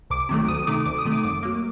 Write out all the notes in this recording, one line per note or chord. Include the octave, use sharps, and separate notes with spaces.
C2 D6
C3 D#3 F#3 A3
D2 D#6
C3 D#3 A3 D6
D2 D6
D#6
C3 D#3 A3
D6
F#2 D6
F#3 A#3